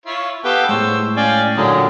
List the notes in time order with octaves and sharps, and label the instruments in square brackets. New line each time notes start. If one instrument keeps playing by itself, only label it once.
[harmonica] E4 F4 C#5
[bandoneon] B3 G4 B4 [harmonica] A4 F5 G5
[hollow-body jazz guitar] A2 G#3 [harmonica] C5 C#5 [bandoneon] E6
[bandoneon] C#4 D5 [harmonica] F5 G5 G#5
[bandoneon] A#2 D3 F#3 [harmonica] G4 G#4 D#5